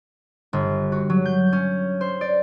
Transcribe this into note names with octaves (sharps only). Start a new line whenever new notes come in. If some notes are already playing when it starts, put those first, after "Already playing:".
G1
F#4
F#3
G6
C#4
C5
D5